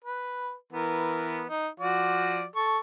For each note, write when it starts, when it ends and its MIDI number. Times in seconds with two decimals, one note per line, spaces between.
0.04 0.55 71
0.73 1.45 52
0.73 1.45 59
0.73 1.45 70
1.49 1.68 63
1.80 2.45 53
1.80 2.45 66
1.80 2.45 74
2.56 2.78 69
2.56 2.78 85